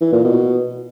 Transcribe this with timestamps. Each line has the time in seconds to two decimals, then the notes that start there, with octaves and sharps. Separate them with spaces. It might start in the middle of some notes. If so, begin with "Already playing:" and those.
0.01 E3
0.13 A#2
0.25 B2